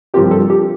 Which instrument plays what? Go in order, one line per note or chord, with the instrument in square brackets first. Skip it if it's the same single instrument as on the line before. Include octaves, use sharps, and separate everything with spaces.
[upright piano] G2 F3 C4 F4 A#4 [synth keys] G4
[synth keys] A4
G4